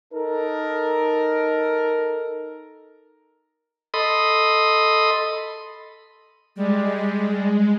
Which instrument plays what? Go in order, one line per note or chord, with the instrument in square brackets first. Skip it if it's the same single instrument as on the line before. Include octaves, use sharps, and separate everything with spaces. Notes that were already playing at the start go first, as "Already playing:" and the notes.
[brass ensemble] D#4 A4 A#4
[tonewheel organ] A4 D#5 B5 C6 D#6
[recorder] G3 [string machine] G#3